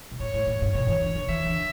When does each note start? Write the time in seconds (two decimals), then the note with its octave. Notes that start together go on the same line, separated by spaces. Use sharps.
0.11 B2
0.20 A2 C#5
0.34 A2
0.47 A2
0.61 G2
0.75 B2 C#5
0.89 E3
1.01 D3
1.16 D3
1.29 E3 E5
1.46 D3